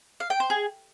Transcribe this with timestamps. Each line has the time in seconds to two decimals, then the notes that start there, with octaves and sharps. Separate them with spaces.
0.20 F5
0.30 G5
0.40 C5
0.50 G#4